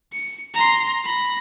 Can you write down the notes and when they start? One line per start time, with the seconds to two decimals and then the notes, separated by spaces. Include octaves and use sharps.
0.12 C#7
0.54 A#5 C6
1.04 B5 A#6